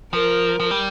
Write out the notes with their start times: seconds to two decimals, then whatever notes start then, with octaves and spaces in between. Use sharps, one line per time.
0.13 F3 A#4
0.60 F3
0.71 G3